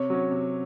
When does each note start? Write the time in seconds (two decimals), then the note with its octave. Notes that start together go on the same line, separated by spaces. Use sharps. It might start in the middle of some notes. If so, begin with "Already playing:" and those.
Already playing: C3 C#5
0.10 F#3 C#4
0.31 C3